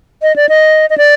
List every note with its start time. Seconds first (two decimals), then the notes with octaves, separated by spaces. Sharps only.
0.22 D#5
0.36 D5
0.49 D#5
0.90 D#5
0.98 D5